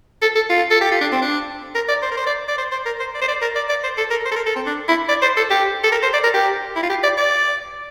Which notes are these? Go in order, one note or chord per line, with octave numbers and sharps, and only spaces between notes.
A4
A4
F4
A4
G4
F4
D4
C4
D4
A#4
D5
C5
A#4
C5
D5
D5
C5
C5
A#4
C5
D5
C5
D5
A#4
D5
D5
C5
A4
A#4
C5
A4
A#4
A4
C4
D4
E4
D5
C5
A4
G4
A4
A#4
C5
D5
A#4
G4
E4
F4
G4
D5
D5